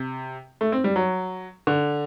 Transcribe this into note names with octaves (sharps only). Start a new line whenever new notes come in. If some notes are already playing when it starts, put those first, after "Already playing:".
Already playing: C3
A3
C4
G3
F#3
D3